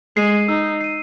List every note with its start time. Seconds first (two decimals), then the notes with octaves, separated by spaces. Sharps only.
0.17 G#3 C7 D#7
0.48 D#4 E6
0.81 C7 D#7